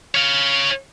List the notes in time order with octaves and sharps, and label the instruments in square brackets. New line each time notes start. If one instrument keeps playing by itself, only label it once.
[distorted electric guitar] C#5 F5